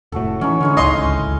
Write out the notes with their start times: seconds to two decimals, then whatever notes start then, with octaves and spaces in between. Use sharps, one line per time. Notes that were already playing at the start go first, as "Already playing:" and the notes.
0.12 F1 A2 F#4 A4
0.41 E3 C#4 D#4
0.60 D3 G#3 C#4 E4
0.77 D1 G#1 C#2 D#4 D#5 C6